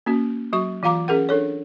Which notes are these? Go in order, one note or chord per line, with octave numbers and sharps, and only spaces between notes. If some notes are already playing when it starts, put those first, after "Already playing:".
A#3 C#4 F#4
F#3 F#4 C#6
E3 F4 F5 A#5 D6
C#4 G#4 A#4 F#5
D4 A4 C#5